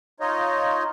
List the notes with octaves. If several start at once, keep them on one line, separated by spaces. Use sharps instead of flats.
D#4 F4 C#5 D#5